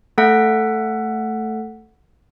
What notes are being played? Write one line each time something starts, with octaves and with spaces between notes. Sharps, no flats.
A3 A4 F#5 B6